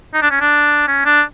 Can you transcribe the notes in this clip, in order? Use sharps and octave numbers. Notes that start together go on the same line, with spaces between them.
D#4
D4
C#4
D4
C#4
D4